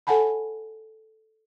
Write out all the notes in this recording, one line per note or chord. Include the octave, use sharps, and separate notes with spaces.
A4 C#5 F#5 G#5 A5 B5